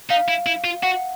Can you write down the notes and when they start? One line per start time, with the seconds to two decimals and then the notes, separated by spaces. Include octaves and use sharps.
0.10 D#4 F5
0.29 E4
0.46 E4
0.64 F4
0.83 F#4 F#5